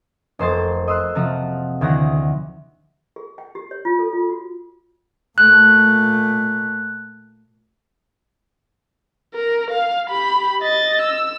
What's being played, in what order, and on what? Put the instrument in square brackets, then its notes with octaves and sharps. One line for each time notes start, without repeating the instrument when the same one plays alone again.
[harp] F1 A#3 C5 D#5 C6 A6
D#5 C6 E6 F#6
C3 F3 F4 F#4
D2 D#3 E4 F#5 A#6
[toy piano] G#4
G5
G4
C#5
F4
A4
F4
F#4
[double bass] A#2 A3 [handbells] F#6
[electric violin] A#4
F5
G4 B5
D#5 A6
E6